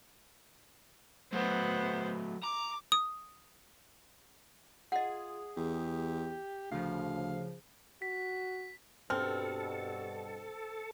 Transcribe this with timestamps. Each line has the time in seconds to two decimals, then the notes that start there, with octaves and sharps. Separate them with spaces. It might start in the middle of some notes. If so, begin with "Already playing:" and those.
1.32 F#3 A3 B3 C5
2.43 A#5 D6
2.92 D#6
4.92 F4 G#4 D#5 F#5
5.57 E2 G4
6.71 D2 C#3 F3 F5
8.02 F#4 B6
9.10 G2 B2 C4 A4 F6